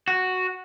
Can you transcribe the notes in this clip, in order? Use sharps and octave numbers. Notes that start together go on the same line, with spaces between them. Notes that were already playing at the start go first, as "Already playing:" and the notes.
F#4